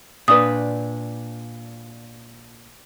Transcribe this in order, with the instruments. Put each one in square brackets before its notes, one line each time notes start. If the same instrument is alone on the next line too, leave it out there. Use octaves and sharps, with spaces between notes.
[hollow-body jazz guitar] A#2 D4 B4 [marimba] D#6